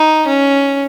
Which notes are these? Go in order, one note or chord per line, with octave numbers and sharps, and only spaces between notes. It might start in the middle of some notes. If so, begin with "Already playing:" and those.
Already playing: D#4
C#4